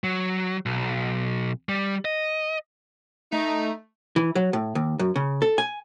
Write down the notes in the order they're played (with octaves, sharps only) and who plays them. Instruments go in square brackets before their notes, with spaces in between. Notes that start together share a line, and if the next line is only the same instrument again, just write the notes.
[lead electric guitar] F#3
B1
G3
D#5
[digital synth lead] A3 [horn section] D#4
[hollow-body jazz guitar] E3
F#3
A2
D#2
F#2
C#3
A4
G#5